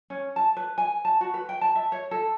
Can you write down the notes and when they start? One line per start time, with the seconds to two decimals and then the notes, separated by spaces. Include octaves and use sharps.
0.10 C#4
0.36 A5
0.57 B4
0.78 G#5
1.05 A5
1.21 F#4
1.34 B4
1.49 G5
1.61 A5
1.75 E5
1.92 C#5
2.11 A4